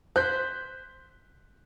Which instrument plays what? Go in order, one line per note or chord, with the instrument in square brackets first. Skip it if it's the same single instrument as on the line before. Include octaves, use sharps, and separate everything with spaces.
[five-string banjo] C5 [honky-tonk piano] F#6 G6 B6